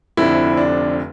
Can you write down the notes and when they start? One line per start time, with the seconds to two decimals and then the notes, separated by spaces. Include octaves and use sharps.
0.17 F1 F2 D3 E4
0.57 D4